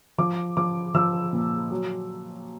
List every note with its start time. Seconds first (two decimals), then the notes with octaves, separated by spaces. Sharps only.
0.18 F3 D6
0.57 F3 D6
0.94 F3 E6
1.33 A#2
1.71 F#3